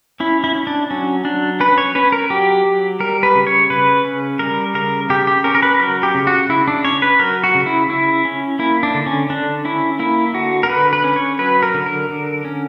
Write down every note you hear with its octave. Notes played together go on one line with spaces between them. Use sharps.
C#4 E4
E4
C#4
D4
F#3 C#4
F#3 D4
C#4 B4
C#5
C#4 B4
A#4
F#3 G4
F#3
G3 A#4
B4
C#3
C#5
C#3 B4
C#4
G3 A#4
C#3 A#4
C#3 G4
G4
C#4 A#4
A#4
B4
F#3 A#4
G4
C#3
F#4
C#3 E4
D4
C#4 C#5
B4
F#3 A#4
F#4
C#3
E4
C#3 E4
C#4
A#3 E4
D4
D3
C#4
D3 D4
C#4 E4
A#3 E4
D3 F#4
A#4
D3 B4
B4
C#4
C#5
F#3 B4
A#4
D3
A#4
D3
C#4